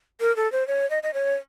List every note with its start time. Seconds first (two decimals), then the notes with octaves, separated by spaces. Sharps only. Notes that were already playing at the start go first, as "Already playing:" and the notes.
0.21 A#4
0.37 A4
0.52 C5
0.67 C#5
0.90 D#5
1.03 D#5
1.14 C#5